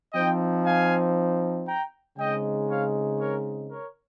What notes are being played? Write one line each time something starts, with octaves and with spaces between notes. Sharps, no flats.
F3 C4 D#4 D#5 G5
F5 G#5
G5 A#5
C#3 G#3 C4 D#4 D#5 G5
C#5 F5
A#4 C#5
A#4 C#5